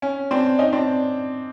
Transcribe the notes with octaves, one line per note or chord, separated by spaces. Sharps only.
C#4
C4 D4
C#4 D#4
C4 D4